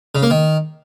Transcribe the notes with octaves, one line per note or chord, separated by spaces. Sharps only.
C#3
A#3
D#3